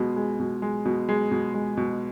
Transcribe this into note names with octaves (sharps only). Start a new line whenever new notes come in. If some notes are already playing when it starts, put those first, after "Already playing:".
Already playing: B2 G#3
G#3
B2
G#3
B2
G#3
B2
G#3
B2